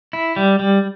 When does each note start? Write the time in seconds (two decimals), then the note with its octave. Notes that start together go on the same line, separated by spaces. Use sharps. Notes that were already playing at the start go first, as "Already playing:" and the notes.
0.13 E4
0.36 G3
0.59 G3